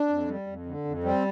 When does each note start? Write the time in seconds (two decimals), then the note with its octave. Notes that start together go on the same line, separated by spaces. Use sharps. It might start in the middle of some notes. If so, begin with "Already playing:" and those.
Already playing: D4
0.09 F2
0.28 G3
0.47 F2
0.66 D3
0.85 F2
1.04 G3 C4